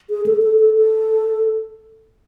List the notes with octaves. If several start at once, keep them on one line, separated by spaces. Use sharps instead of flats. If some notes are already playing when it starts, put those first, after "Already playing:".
G#4
A4
A4
A4
A4